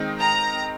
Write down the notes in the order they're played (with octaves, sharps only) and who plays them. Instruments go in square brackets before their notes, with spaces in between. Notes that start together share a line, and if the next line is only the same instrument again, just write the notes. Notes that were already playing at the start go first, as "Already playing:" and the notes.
Already playing: [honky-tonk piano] D#3 G#3 C4 D#4
[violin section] A#5